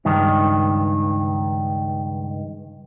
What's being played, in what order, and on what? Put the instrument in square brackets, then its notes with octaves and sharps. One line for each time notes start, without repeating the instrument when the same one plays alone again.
[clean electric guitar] C#2 G2 D#3